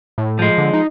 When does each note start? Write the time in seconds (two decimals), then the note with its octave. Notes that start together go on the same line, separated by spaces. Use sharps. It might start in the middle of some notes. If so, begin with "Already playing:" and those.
0.18 A2
0.39 F3 G#3
0.58 D3
0.73 D#4